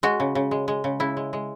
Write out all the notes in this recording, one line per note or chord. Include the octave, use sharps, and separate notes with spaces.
G#3 F#4
C#3
C#3
G#3
G#3
C#3
C#3 E4
G#3
G#3